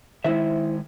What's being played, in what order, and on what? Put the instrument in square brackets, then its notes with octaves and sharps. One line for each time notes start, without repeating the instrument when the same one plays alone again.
[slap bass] D#3 G#3 [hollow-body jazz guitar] E4 C5 E5